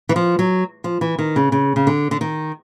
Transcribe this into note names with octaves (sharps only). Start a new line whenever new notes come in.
E3
F3
F#3
F3
E3
D#3
C#3
C#3
C#3
D3
D3
D#3